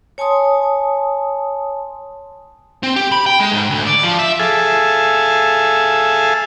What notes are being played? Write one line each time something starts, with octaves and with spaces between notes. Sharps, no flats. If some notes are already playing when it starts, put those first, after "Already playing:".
C#5 G#5 A5 C6 D#6
C4
G4
B5
G5
G#3
G#2
D2
D5
F3
E5
G#4 A4 E5 F5 G#5 A5